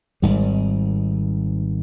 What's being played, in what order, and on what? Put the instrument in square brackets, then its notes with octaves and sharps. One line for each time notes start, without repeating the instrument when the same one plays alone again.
[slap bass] G#1 G#2 G3